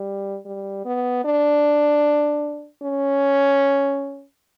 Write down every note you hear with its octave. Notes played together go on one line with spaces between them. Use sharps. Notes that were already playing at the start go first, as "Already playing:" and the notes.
Already playing: G3
G3
B3
D4
C#4